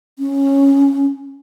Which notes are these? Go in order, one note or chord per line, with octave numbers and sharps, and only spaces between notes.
C#4